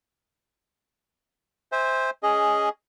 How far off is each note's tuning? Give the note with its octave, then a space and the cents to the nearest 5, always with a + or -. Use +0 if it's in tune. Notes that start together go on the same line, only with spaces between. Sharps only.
C5 +0 E5 -25 G#5 -35
C#4 +5 G#4 +0 D#5 +0